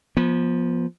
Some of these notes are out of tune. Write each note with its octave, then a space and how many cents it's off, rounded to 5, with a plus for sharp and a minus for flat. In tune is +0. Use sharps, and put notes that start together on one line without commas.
F3 +5 B3 -30